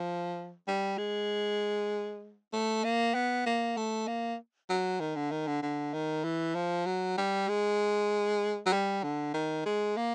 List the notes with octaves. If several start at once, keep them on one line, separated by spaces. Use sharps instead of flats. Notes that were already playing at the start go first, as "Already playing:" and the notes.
Already playing: F3
G3
G#3
A3
A#3
B3
A#3
A3
A#3
F#3
D#3
D3
D#3
D3
D3
D#3
E3
F3
F#3
G3
G#3
F#3
G3
D3
D#3
G#3
A#3